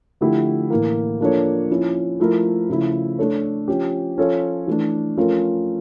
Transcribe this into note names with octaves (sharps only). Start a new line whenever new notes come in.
D3 F3 A3 E4 G4
A2 E3 A#3
F3 A#3 D4 A4 C#5
F3 C#4 E4
F3 A3 E4 A#4
C#3 F3 A3 E4
A3 D4 A4 C#5
F3 C#4 G4
F3 C#4 F4 A4 C#5
E3 A3 D4
F3 A3 C#4 F4 A#4